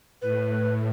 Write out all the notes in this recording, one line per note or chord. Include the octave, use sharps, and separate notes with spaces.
A2 B4